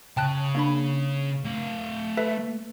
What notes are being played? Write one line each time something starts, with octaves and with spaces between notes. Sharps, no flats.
C#3 G5 A5 F#6
A#3 D4 B5
A3 F5
A4 B4 E5